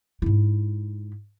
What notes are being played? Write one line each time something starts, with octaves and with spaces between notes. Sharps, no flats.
G#2 E4